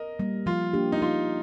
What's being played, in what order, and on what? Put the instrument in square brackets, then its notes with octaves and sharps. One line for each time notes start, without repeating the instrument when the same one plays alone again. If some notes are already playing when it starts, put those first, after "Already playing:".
Already playing: [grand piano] A#4 D#5
[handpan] G3 A#3
[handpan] F3 [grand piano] F4
[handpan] A#3 D4 G4
[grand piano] D#4
[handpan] F3 [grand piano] F4